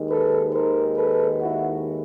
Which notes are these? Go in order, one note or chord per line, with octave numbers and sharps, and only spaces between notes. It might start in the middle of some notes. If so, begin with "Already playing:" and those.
Already playing: D#2 D#3 G#3
A4 B4
A#4 C5
A4 B4
E4 F#4